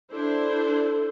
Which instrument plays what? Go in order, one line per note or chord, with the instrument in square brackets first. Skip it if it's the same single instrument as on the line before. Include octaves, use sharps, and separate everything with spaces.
[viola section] D4 E4 C5 [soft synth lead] A4